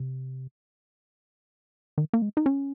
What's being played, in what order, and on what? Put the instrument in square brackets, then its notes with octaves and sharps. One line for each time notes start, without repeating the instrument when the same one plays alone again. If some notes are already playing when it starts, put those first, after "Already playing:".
Already playing: [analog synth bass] C3
D#3
A#3
G#3
D#4
C#4